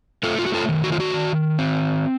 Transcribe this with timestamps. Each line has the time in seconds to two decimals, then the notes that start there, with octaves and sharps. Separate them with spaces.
0.23 A3 F4 A4
0.39 F4
0.46 F#4
0.54 F4 A4
0.69 D#3
0.84 F#4
0.92 F4
1.00 F#4
1.14 D#3
1.59 C4